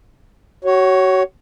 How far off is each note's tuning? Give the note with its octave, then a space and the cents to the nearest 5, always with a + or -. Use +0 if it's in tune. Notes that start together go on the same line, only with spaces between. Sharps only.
F#4 +30 C#5 +0